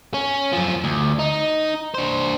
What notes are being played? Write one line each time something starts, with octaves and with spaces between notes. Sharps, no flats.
C#4
F#2 F3
D2
D#4
D4 C5